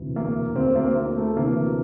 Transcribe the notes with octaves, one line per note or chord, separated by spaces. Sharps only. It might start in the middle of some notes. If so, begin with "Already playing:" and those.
Already playing: E1 D2 C3 E3
A#3
D2 D3 A#3 C4
A#3 C4
A#3
A3
D2 C3 E3 A#3